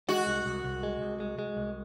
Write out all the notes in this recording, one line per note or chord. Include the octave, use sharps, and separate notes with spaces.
G#3 F#4
C2
C2
C2
G#3
C2
G#3
G#3
C2